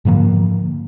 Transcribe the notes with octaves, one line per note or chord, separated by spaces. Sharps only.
G#2 D3 F3 A#3